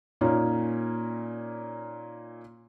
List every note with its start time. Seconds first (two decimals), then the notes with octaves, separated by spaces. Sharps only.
0.21 A#2 A#3 C#4 D#4